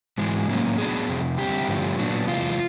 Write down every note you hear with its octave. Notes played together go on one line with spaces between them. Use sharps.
G#2 E3 G#3
A2 F#3 A#3 C#4
A2 F#3 B3 D4 G#4
F2 C3
D3 G3 C4 G4
G2 D3 F3 A3 C#4
A#2 F#3 B3 D4
E2 C3 E3 G#3 F4